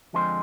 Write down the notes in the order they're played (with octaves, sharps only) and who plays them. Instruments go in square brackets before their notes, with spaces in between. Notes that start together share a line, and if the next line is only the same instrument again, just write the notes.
[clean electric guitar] F2 D3 F3 G#3 C4 C5